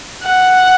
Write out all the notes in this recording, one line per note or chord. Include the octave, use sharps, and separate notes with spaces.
F#5